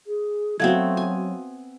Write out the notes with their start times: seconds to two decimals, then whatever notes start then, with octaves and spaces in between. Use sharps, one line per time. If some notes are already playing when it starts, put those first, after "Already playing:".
0.07 G#4
0.60 F#3 A3 B3 C4 F#4 F5 G#6
0.97 G#5